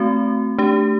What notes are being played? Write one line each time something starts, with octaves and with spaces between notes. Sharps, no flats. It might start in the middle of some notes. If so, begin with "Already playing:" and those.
Already playing: A3 C4 F#4
A3 D4 G4